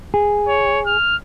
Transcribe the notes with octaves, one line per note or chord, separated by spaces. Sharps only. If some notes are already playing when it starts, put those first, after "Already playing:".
G#4
C#5
F6